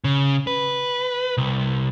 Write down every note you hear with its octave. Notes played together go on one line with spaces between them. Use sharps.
C#3
B4
C2